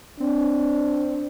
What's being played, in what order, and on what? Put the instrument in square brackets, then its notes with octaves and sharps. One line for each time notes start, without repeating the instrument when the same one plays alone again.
[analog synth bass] C4 [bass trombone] D4